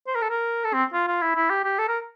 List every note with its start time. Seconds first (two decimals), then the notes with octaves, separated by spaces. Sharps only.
0.07 C5
0.15 A#4
0.22 A4
0.30 A#4
0.65 A4
0.74 C4
0.93 F4
1.07 F4
1.22 E4
1.36 E4
1.50 G4
1.64 G4
1.79 A4
1.88 A#4